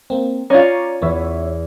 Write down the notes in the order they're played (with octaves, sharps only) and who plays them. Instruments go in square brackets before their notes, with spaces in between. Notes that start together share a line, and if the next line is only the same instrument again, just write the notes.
[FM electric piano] A#3 C4 [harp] E7
[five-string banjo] C#4 F4 [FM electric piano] C#5 D5 A#5
[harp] E2 [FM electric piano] B3 C#5 E5